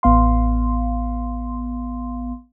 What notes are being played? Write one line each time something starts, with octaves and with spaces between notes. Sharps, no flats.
A1 B3 F5 C6